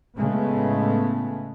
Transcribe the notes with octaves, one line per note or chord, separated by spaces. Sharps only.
A2 C#3 G#3 A3 B3